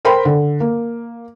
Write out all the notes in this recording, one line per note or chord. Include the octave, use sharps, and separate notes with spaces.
A#4 C5 G5 B5 C6
D3
A#3